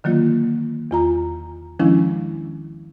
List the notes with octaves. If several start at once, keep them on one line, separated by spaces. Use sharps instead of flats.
D3 D#3 F#3 A#3 F4
E2 F4 A#5
D#3 F3 G#3 C#4 D4 E4